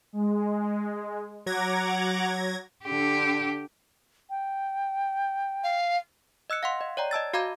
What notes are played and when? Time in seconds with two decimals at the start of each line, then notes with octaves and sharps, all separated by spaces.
0.13 G#3
1.46 F#3 F#5 A#5 D6 G#6 A#6
2.85 D3 G4
4.30 G5
5.63 F5
6.50 D#5 E6 F#6 C#7
6.63 F5 F#5 C6
6.81 D#5
6.97 C#5 D5 G5 A#5
7.11 D#5 A5 E6 A6
7.34 F#4 F5 A#5 B5 D6 G#6